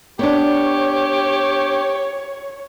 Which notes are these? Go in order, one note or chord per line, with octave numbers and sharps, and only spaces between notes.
B3 D4 G4 C#5